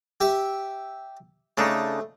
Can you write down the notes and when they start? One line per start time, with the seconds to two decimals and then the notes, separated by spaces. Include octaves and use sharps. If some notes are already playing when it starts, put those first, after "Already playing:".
0.21 G4 E5
1.57 C#3 A3 D4 D#4